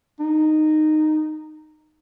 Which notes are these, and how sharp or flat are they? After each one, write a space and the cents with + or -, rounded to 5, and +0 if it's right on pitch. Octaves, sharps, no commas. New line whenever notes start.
D#4 -10